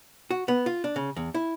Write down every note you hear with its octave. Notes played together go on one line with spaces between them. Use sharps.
F#4
B3
F4
D4
C#3
E2
E4